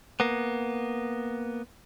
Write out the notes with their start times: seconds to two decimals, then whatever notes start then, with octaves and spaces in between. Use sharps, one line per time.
0.20 A#3 B3